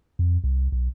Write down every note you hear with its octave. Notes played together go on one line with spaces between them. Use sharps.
F2
C2
B1